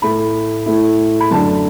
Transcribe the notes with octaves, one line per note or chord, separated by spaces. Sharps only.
A2 A3 E4 B5
A2 A3 E4
B5
F#2 D3 A3 A5